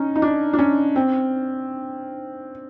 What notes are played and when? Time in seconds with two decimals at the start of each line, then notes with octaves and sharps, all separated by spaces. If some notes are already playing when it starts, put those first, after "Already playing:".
Already playing: C#4 D#4
0.16 D#4
0.22 D4
0.53 D4
0.59 C#4
0.96 C4